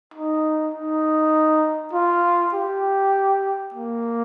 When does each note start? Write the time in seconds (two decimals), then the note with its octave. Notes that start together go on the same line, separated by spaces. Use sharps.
0.14 D#4
0.74 D#4
1.93 F4
2.54 G4
3.74 A#3